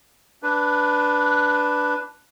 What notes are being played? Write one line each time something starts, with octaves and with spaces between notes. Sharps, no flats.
D4 B4